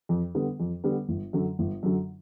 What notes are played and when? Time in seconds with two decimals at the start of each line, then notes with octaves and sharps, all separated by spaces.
0.09 F2
0.35 D3 G3 B3
0.60 F2
0.84 D3 G3 B3
1.09 G1
1.33 F#2 D3 F#3
1.59 G1
1.83 F#2 D3 F#3